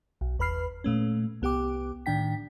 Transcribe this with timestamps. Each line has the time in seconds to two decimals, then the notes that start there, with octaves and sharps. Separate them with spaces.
0.21 B1
0.38 G1 E2 B4 B5 F6 C7
0.84 A#2 A3 C#4
1.42 C2 B3 G4 G5 D6
2.06 A2 D#3 D4 G5 B6